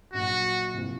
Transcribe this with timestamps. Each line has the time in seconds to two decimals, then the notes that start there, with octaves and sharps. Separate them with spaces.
0.13 A#1 A#2 F#3 F#4
0.74 C2 A#2 F3 C4